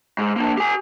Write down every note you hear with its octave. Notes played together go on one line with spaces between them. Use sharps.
G#2
A#3 D4
G4 G#5